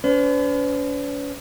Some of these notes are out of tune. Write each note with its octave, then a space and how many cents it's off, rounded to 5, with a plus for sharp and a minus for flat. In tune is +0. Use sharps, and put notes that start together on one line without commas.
C#4 +45 B4 +45